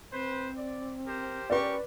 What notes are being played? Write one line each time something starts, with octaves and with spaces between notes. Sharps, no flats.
C4 B4 C5
D5
G4 A#4 C5
C#4 G4 A#4 B4 D5 C#6